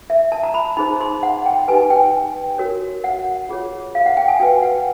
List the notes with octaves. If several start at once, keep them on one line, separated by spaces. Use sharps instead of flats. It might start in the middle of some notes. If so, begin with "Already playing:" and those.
E5
A5
A#5
B5
D#4 G#4 C5 B5
C6
F#5
G5
D#4 G4 B4 G#5
G5
F#4 A#4 C#5
F#5
F4 G#4 C#5
F5
F#5
G5
G#5
F#4 B4 G5
F#5